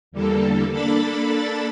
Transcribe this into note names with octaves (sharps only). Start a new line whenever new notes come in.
E2 D3 G3 A#3 A4
A#3 D4 A4 B5 A6